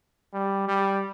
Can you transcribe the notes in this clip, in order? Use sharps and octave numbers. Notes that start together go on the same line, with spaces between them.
G3
G3